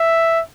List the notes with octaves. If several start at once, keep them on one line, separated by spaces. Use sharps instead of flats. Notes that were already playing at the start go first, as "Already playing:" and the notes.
Already playing: E5